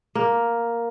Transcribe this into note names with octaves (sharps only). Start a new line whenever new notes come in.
A#3